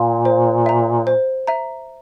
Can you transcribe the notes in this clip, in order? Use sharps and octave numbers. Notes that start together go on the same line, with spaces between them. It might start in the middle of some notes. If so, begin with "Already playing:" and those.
Already playing: A#2 F5 G#5 C6
C5
E5 A#5
C5
E5 A#5